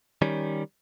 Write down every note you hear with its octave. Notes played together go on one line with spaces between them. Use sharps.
D#3 G3 C#4